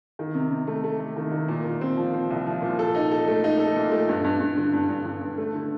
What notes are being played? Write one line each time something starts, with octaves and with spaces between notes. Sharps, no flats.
D#3
C3
C3
A3
A3
A3
D#3
D#3
A#2
A#2
C4
F3
C4
C2
F3
A#2
A4
D#4
A4
A3
D#4
A4
A#2
A3
G2
G2
G2
D3
G2
G2
G2
G2
A3
D3